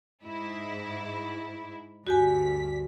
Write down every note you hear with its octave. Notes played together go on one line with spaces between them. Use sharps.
G#2 E4
D2 G2 F#4 G4 G#5 B6